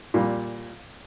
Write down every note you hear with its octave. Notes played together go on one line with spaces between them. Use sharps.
A#2 G3